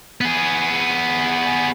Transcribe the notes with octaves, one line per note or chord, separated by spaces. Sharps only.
B3 G#4